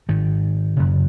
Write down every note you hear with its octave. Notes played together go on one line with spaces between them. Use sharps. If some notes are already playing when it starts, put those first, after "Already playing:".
G#2 D#3
F#2 C#3